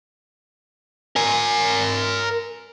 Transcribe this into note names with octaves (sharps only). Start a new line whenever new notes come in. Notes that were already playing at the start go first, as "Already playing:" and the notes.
A#4 G#5